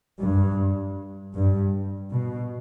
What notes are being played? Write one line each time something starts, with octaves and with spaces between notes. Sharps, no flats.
G2
G2
B2